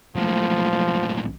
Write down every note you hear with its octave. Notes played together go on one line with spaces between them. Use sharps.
B1 A2 F3